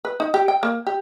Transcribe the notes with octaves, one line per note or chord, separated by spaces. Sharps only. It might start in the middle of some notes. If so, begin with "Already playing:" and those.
B4
D#4
G4
G5
A#3
G4